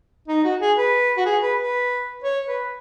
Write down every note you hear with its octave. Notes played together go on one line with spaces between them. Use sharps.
D#4
F#4
G#4
B4
F#4
G#4
B4
B4
C#5
B4